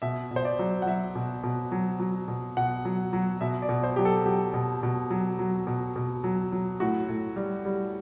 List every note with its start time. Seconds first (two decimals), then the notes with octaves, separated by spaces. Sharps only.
0.02 B2 E5
0.31 B2
0.36 C5
0.45 D5
0.59 F#3
0.82 F#5
0.86 F#3 E5
1.16 B2
1.44 B2
1.72 F#3
2.00 F#3
2.28 B2
2.57 B2 F#5
2.85 F#3
3.13 F#3
3.41 B2 E5
3.62 D5
3.69 B2
3.83 C5
3.96 F#3 G4
4.05 A4
4.26 F#3 G4
4.54 B2
4.83 B2
5.11 F#3
5.39 F#3
5.67 B2
5.96 B2
6.24 F#3
6.52 F#3
6.80 A2 F#4
7.08 A2
7.36 G3
7.65 G3